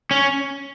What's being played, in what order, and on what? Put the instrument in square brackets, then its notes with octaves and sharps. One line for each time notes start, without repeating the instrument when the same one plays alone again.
[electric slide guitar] C#4